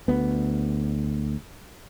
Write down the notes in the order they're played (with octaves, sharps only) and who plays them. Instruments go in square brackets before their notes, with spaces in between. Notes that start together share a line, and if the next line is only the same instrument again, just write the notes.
[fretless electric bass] D2 B3